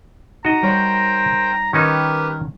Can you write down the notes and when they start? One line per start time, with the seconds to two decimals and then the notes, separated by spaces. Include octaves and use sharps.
0.45 D#4 F#4 D#5 A#5
0.62 G3 A#4 C5 C#5 G5 F#6
1.73 D#3 C#4 D#4 G4 A#4 B4